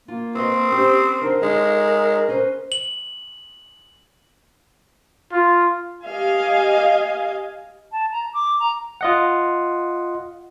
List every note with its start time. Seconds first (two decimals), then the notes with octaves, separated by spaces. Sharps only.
0.08 A#3 F4
0.35 C4 A#4 B4 D#5
0.72 C#4 G4 C5
1.22 D3 D#4 A#4 C5
1.42 G#3 D#4 A4
2.28 C#4 B4 C5
2.72 F#7
5.32 F4
6.05 G4 D#5 F5 G#5
7.92 A5
8.12 A#5
8.34 D6
8.60 A#5
9.01 F4 D#5 F#5